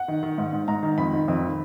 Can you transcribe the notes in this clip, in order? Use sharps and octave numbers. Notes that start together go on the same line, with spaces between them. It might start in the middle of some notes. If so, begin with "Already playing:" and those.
Already playing: F#5
D#3
D#3
G#2
G#2
G#2 A#5
D#3
F2 B5
D#3
F2
D#3